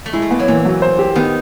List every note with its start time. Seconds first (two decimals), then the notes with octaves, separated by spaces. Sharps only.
0.06 A3
0.13 G#3 E4
0.22 A3
0.31 A#3 B3
0.39 F#3
0.48 A#2 E3
0.65 F#3
0.82 C5
0.99 G4
1.16 D#3 B3